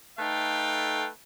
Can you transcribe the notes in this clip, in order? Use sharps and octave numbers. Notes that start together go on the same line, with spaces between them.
A3 D#4 A4 B4 F5 G5